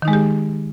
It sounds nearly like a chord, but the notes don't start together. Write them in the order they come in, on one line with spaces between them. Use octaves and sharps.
D#3 D#4 G#3 G#4 G4